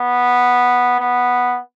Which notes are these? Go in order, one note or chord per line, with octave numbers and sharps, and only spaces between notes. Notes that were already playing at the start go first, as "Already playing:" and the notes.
Already playing: B3
B3